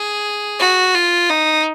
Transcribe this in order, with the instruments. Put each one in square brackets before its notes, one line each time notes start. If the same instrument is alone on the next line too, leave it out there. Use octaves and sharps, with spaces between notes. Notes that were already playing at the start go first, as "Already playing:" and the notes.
Already playing: [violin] G#4
F#4
F4
D#4